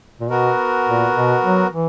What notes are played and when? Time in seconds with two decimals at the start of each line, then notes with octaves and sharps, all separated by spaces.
0.20 A#2
0.30 B2 B3 F#4 A#4
0.87 A#2
1.16 B2
1.44 F#3
1.73 E3